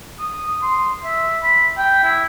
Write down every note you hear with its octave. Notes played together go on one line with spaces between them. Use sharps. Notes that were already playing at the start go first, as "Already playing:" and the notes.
D#6
C6
E5
B5
G5
E4